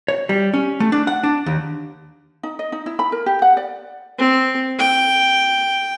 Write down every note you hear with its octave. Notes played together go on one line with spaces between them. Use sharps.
C#5
G3
C#4
A3
D4
F#5
D4
D#2
D#4
D#5
D#4
E4
B5
A#4
G4
F#5
D5
C4
G5